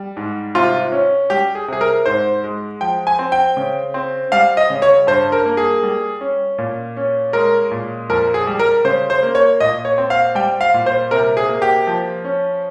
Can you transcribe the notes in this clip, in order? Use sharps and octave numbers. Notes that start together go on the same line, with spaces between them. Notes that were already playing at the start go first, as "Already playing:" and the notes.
Already playing: G3
G#2
C3 F4
C#4
G3 G4
G#4
C3 G#4
A#4
G#2 C5
G#3
F3 G5
G#5
C4
G5
C#3
C4
G3 F5
D#5
C#3
C#5
G2 C5
A#4
A#3
G#4
G3
C#4
A#2
C#4
G#3 A#4
A#2
F2 A#4
G#4
G3
A#4
C#3 C5
C5
A#3
C#5
A#2 D#5
C#5
C4
F5
G3 G5
F5
A#2
C5
C3 A#4
G#4
A#3
G4
F3
C#4